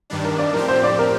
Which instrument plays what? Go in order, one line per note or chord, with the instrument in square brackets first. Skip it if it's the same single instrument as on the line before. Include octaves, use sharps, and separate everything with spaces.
[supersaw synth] G2 D#3 G3 D4
[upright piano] A#4
D5
[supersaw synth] A2 F3 C4 G4 [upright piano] A#4
[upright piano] C5
D5
A#4